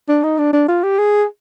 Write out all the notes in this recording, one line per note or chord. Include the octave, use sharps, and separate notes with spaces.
D4
D#4
D4
D4
F4
G4
G#4